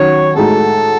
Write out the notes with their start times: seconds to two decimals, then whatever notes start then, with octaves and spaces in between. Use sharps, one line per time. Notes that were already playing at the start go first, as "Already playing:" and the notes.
Already playing: D#3 F#3 C#4 F#4 C#5
0.36 A2 G#3 D#4 F#4 A4